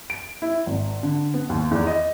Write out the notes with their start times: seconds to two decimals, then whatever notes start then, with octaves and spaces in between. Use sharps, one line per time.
0.10 D7
0.42 E4
0.66 G#1
1.03 D3
1.34 B3
1.49 D#2
1.71 E2
1.87 D#5